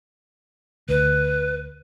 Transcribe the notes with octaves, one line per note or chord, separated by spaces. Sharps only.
D2 B4